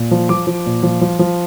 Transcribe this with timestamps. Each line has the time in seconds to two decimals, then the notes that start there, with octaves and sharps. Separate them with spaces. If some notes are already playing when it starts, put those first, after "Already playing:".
Already playing: A#2
0.11 F3
0.29 F3 D6
0.47 F3
0.66 A#2
0.83 F3
1.01 F3
1.19 F3